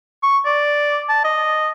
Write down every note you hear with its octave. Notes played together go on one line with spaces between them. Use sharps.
C#6
D5
A5
D#5